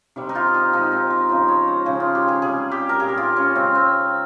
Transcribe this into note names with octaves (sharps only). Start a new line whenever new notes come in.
C3 D#3 G3
D#4
F4
D#4
A#2 F3 G#3 D#4
C4
D#4
C#3 F3 G#3 F4
C#5
C5
C#3 F3 G#3 G#4
F4
G4
G#4
C3 G3 G#4
G4
A#4
A#2 G3 G#4
G4
F4
C#4
C#3 G#3 C4
C4